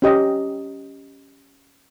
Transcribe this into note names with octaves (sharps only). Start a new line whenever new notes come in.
C#4 G4 D#5